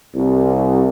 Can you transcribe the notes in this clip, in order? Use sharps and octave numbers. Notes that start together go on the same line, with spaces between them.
C2